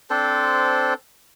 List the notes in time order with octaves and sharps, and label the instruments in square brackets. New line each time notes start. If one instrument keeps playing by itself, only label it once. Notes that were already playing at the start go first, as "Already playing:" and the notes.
[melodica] C4 D4 A4 C5